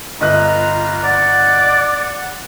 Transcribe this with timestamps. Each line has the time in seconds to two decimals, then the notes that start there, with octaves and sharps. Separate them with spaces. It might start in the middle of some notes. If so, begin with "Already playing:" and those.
0.21 G1 F4 B4 D#5 A#5 F#6
1.04 D5 F#5